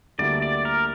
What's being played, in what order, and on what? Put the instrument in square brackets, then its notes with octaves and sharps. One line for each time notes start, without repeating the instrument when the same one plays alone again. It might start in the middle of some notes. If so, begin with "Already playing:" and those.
[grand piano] D2 D3 G3 A#3 E4 [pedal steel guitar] D5
[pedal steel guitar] D5
A#4